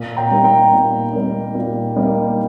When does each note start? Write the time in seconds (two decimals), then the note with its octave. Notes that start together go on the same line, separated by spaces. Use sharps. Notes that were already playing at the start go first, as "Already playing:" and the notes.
Already playing: A#2
0.16 G5 A#5
0.31 G3 A#3 D#4
0.44 G5 A#5
0.72 A#2
1.13 G3 A#3 D#4
1.55 A#2
1.96 G3 A#3 D#4